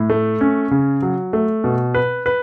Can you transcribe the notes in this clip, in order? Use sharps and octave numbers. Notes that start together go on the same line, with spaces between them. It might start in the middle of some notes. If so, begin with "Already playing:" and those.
Already playing: A2
A3
C#4
C#3
F#3
A3
B2
B4
B4